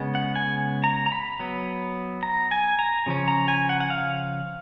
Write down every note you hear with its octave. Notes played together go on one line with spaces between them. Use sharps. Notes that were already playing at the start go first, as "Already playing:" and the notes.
Already playing: C#3 G#3 B3
F#5
G#5
A#5
A#5
B5
F#3 B3
A#5
G#5
A#5
C#3 F3 C#4
A#5
G#5
F#5
F#5
F5